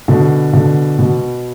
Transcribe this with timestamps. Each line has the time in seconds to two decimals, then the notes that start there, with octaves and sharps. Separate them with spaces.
0.08 B2 D3
0.53 B2 D3
0.98 B2